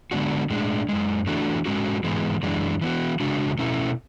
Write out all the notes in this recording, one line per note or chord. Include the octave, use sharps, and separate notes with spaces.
D3 G#3 B3 D4 F#4
A2 G#3 D4
F#2 C#3 G#3
E3 A3 D4 F#4
G#2 G#3 C#4 F#4
G#2 E3 G#3 B3
F#2 E3 G#3 D4
E3 B3 F#4
C#3 G#3 D4 F#4
B2 A3 C#4 E4